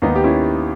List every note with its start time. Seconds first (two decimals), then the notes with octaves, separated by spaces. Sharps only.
0.02 D#2 D#3 B3 D#4
0.16 G4
0.24 C#4 E4